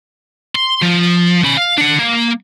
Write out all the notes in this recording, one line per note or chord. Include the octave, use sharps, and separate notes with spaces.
C6
F3
C#4 B5
F5
D4 F#5
A#3